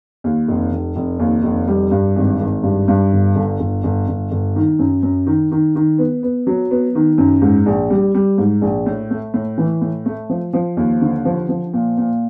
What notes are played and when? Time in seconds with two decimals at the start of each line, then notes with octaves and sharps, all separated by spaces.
0.24 D#2
0.48 F1
0.72 F1
0.96 F1
1.19 D#2
1.44 F1
1.68 G3
1.91 G2
2.16 G#1
2.40 G#1
2.63 G2
2.88 G2
3.12 G1
3.35 G1
3.59 G1
3.83 G1
4.07 G1
4.31 G1
4.56 D#3
4.79 F#2
5.03 F#2
5.27 D#3
5.52 D#3
5.75 D#3
5.98 B3
6.23 B3
6.47 F#3
6.71 B3
6.95 D#3
7.18 F#2
7.42 G#2
7.66 A#1
7.90 G3
8.14 G3
8.38 G#2
8.62 A#1
8.86 A2
9.11 A3
9.34 A2
9.58 E3
9.82 A2
10.06 A3
10.29 F3
10.53 F3
10.77 D#2
11.02 D3
11.25 F3
11.49 F3
11.74 A#2
11.98 A#2